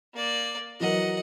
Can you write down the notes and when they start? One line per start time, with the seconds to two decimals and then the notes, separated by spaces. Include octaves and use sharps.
0.14 A#3 D5
0.80 E3 F#3 A#4 D#5 F#5